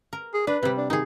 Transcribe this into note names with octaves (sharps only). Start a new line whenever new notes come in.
A#4
G#4
D4 B4
C3 G3 B4
D4
D#3 D#4 G#4